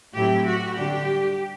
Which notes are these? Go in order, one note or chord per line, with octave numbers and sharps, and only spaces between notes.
A2 F#3 C4 E4 G4
F#4
D3 G3 D4 G4